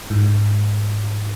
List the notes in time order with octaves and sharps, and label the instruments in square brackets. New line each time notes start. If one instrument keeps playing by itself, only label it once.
[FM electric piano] G#2